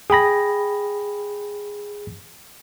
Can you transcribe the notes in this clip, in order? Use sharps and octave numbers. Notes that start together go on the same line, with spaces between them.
G#4 G5 B5 A#6